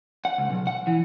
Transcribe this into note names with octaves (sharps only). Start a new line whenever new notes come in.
F#5
C#2
B1
F#5
E3